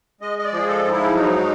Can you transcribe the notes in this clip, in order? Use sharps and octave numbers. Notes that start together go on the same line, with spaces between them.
G#3 D#5
D#5
D5
F3 G#4
A4
G#2
E4
F#3 D#4